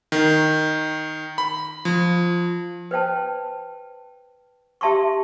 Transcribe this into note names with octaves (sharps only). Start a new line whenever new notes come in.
D#3
B5
F3
B4 C5 G5 A5
G4 E5 A5 C6 C#6